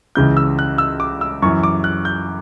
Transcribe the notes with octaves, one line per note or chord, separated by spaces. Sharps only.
C#2 C#3 E3 G6
E6
F#6
E6
D6
E6
F#2 E3 C#6
D6
F#6
G6